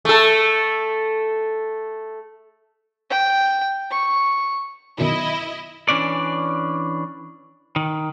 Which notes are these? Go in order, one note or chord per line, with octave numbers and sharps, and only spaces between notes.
A3 A4
G5
C#6
F#2 B2 D#3 E4 D#5
E3 C#4 D4 D5
D#3